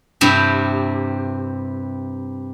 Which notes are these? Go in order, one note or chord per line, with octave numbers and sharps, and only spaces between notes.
G2 C3 C4 E4 G4